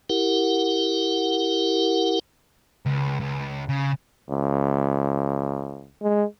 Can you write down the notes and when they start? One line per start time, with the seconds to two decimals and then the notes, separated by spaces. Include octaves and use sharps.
0.10 E4 G4 A#4 F#5
2.86 C#2
3.20 C#2
3.69 C#3
4.30 C#2
6.02 G#3